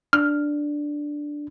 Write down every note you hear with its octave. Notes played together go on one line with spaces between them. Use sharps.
D4 F6